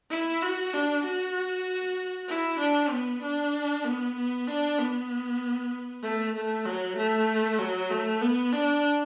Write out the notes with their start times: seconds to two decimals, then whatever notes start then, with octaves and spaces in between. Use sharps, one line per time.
0.11 E4
0.42 F#4
0.73 D4
1.04 F#4
2.29 E4
2.60 D4
2.91 B3
3.22 D4
3.85 B3
4.16 B3
4.47 D4
4.78 B3
6.03 A3
6.35 A3
6.66 F#3
6.97 A3
7.59 F#3
7.90 A3
8.21 B3
8.53 D4